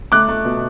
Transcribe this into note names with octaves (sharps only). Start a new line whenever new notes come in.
A3 D6 F#6
A3
B2